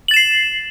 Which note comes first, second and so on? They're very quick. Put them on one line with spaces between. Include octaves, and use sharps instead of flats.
F#7 A6 E7 C7